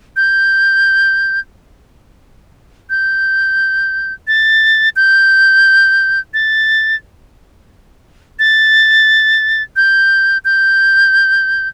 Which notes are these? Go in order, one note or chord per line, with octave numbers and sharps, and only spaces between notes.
G6
G6
A6
G6
A6
A6
G6
G6